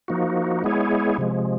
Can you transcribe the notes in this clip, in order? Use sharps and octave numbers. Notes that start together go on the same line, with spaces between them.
F3 A#3 D#4 F#4
G#3 B3 E4 G#4 C#5
C3 F3 G#3